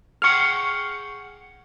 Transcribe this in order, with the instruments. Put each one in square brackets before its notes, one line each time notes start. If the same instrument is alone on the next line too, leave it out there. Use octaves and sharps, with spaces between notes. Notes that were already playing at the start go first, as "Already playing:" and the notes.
[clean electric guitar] G#4 F#5 G5 [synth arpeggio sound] C#6 F6